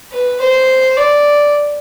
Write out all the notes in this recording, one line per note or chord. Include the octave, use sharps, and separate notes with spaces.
B4
C5
D5